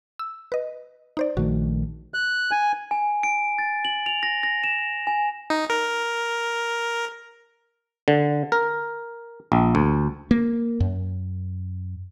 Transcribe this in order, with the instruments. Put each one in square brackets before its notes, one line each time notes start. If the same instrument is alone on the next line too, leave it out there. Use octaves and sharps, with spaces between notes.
[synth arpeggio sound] E6
B4 D#5
D#4 C5 D5
[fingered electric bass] A#1 D#3 A3 [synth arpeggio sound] F#4
[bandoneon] F#6
G#5
[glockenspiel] G#5
D7
A6
F#7
F7
A#6
A#6
E7
G#5
[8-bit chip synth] D#4
A#4
[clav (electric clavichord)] D3
A#4
A#1
D2
[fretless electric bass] A#3
F#2